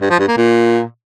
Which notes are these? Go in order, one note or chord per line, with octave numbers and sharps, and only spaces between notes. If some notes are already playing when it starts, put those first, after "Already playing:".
G2
F3
G2
A#3
A#2